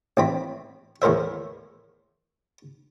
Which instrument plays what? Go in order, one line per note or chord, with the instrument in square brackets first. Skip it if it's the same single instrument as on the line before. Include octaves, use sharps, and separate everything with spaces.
[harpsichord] A1 C4 B5
E2 A2 A#4 C5 E5